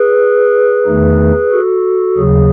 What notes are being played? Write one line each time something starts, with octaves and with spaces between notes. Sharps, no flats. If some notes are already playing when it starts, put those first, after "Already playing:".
Already playing: G#4 B4
E2 D#3 A3 D#4
F#4 A4
D#2 C#3 F#3 G#4